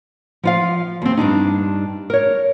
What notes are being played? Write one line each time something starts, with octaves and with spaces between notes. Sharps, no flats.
F3 F4 F5
D#2 C4
G2 D#3 D4 D#4
A#4 C#5